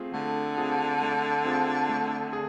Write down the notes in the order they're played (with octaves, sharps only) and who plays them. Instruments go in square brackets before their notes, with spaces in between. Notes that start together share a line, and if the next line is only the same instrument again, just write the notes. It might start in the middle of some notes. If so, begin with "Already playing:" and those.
Already playing: [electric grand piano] A3 C4 F4 G#4
[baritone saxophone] D3 [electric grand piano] A3
[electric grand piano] C4 F4 G#4
A3
C4 F4 G#4
A3
G#4